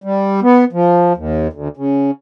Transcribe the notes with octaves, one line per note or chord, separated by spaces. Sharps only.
G3
B3
F3
D#2
D2
C#3